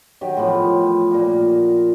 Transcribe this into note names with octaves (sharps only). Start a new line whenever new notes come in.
D#3 F#3 G4
A2 E3 F3 B3
A#2 A#3